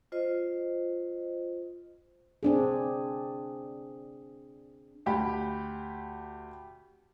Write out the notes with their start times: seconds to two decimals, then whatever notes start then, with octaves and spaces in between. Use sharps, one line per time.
0.12 F4 C5 D#5
2.43 C4 D4 G#4
5.06 D2 G4 B5